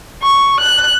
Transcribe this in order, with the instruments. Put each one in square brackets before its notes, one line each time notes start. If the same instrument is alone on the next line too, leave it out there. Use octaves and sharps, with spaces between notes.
[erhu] C#6
F#6